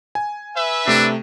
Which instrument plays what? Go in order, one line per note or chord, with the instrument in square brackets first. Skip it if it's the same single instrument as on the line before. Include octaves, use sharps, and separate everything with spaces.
[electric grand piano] G#5
[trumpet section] B4 E5
[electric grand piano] C3 A3 [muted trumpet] D4